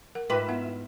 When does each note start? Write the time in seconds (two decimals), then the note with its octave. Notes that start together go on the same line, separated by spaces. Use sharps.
0.15 A#4 F#5
0.30 G#2 F4 B4 E5 G5 D6
0.49 B3 E4 F#5